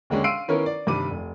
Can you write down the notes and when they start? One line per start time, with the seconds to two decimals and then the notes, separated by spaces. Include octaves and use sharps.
0.10 D#2 D3 G#3 C#4 D4
0.24 F5 C6 E6 C7 D7 D#7
0.48 D#3 B3 C#4 E4 A#4 C#5
0.66 D5
0.87 G2 C3 D#3 G3 D6 D#7
1.11 F1